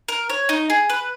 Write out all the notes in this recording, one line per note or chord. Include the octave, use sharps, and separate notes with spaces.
A#4
C#5
D#4
G#4
B4